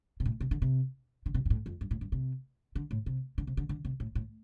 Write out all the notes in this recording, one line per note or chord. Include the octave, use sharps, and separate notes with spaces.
C3
A2
C3
D3
C3
D3
C3
G2
A2
F2
G2
A2
G2
C3
D3
A2
C3
D3
C3
D3
D3
C3
A2
A2